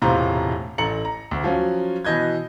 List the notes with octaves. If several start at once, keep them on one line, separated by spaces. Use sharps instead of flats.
E1 A2 C3 F4 C5 A#5
A1 A4 A#5 C#7 F#7
A#5
D2
F3 F#3 C#4
B2 E3 D#5 G6 G#6